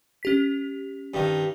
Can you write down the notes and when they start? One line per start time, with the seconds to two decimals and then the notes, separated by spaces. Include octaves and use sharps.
0.23 C#4 G4 B6
1.14 G2 D#3